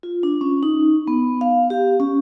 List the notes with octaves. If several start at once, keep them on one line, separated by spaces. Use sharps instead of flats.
F4
D4
C#4
D#4
B3
F5
G4
C#4